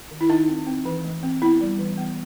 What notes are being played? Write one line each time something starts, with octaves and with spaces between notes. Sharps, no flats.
D#3
E4
D#3 D#4
C4
C4
E3
A3
C4
B3 E4
G3
E3
B3